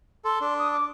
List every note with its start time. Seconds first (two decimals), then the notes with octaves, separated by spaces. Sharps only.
0.25 A4 C6
0.41 D4
0.59 D#6
0.71 D6